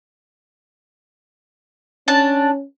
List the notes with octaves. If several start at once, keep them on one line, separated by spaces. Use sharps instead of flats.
C#4 D4 A5